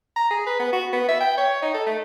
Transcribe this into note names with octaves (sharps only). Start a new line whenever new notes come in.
A#5
G#4
B4
B3
F#4
B3
E5
G5
C#5
D#4
A4
A3